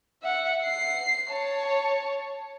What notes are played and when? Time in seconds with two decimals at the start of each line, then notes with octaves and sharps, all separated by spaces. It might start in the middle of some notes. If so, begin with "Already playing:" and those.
0.23 E5 F#5
0.65 C7
1.30 C#5 A5